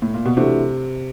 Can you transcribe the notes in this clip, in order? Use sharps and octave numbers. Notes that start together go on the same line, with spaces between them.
A2
A#2
B2
C3 E3 A3 D4 F#4